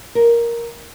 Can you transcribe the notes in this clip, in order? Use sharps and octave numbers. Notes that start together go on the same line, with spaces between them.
A#4